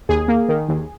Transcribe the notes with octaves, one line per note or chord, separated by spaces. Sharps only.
D#2 G#4
A#3
D#3
D#2